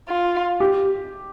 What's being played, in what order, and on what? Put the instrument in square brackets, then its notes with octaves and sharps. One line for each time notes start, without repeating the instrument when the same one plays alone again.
[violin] F4
[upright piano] G4